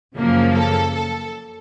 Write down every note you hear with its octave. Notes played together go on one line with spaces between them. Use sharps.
F#2 C#3 F3 A#3
A4
A4